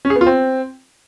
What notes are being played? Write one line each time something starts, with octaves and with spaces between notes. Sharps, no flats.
C#4
G#4
B3
F4
C4